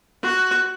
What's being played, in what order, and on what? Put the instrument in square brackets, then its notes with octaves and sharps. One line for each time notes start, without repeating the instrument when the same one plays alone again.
[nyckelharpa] F#4